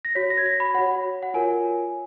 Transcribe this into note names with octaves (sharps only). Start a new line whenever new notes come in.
A#6
F#4 C#5 B6
A#6
G#6
A#6
B5
F#4 C#5 F#5
F#5
F4 A#4 C#5 G#5